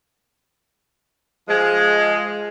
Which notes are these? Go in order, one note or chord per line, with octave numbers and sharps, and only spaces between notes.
F3 G#3